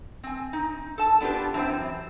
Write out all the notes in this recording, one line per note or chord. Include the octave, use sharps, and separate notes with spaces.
C4 G#5
D#4
A4 A5
B3 D4 F4 G4 B4
F#2 E3 C4 C5 G5